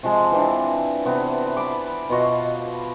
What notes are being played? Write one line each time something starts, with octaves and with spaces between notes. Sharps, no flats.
C3 F3 G#3 A5
E3 C4 D4
C3 B3 C4
A5 B5 D6
B2 F4 F#4 D#5